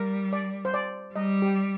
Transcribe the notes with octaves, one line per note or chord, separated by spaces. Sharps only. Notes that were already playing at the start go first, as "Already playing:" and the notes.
Already playing: G3 A#4
D5
C5
D5
G3 D#5
G4